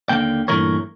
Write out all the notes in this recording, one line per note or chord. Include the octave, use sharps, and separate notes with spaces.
D#2 D3 A#3 G5
G2 A#2 E3 A3 A#4 C#5